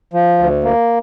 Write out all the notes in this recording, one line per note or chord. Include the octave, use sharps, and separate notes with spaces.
F3
D2
A#3